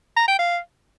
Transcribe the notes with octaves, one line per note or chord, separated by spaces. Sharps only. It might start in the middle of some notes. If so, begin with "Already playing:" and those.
A#5
G5
F5